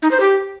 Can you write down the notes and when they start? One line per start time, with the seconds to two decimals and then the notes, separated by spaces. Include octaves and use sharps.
0.02 D#4
0.11 C5
0.20 G4